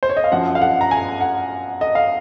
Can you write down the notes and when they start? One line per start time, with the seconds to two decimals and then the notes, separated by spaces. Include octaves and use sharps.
0.03 C5
0.09 C#5
0.17 D#5
0.24 F5
0.31 F#2 F3 F#5
0.55 F5
0.61 F#5
0.81 A#5
0.91 G#5
1.21 F#5
1.81 D#5
1.95 F5